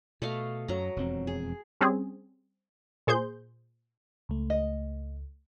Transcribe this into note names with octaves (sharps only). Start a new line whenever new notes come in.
B2 A3 D#5 F5
F#2 F#3 A#5
E1 F2 C4
G#4
G3 C4 C#4 G#4
A#2 G#4 C5 C6 G6
C#2 A3
D#5